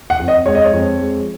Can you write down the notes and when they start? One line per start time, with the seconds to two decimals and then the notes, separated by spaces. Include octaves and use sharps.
0.10 F#5
0.19 F2
0.28 D#5
0.46 G#3 C#5
0.55 D#5
0.64 C#5
0.73 F2
1.00 G#3